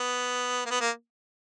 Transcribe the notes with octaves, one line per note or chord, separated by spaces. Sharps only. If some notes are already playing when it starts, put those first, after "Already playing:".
Already playing: B3
A#3
B3
A#3